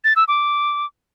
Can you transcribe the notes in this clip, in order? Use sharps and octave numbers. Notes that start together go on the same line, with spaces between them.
A6
E6
D6